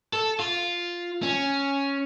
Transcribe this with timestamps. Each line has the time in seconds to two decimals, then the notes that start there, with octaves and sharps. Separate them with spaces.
0.13 A4
0.40 F4
1.23 C#4